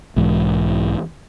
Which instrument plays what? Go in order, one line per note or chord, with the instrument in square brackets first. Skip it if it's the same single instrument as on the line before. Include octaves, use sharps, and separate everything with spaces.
[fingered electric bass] B1 G#2 E3